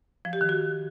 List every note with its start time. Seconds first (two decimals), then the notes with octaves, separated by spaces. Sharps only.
0.25 F3
0.33 G4
0.41 D#3
0.49 F#4